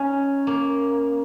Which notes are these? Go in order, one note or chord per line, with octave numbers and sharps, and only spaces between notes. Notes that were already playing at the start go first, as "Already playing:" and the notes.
Already playing: C#4 D#4
A#3